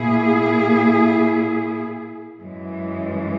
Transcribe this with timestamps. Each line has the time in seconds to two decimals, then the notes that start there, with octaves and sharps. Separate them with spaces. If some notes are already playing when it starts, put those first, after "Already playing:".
Already playing: A#2 A#3 E4 G#4
2.40 F#2 E3 G#3